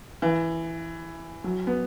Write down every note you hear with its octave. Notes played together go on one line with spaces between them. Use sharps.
E3
F#3
B3